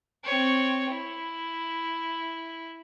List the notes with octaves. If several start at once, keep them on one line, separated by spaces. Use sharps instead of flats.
C4 C#5
E4